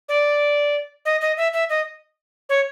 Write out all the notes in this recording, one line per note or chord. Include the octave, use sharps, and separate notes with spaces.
D5
D#5
D#5
E5
E5
D#5
C#5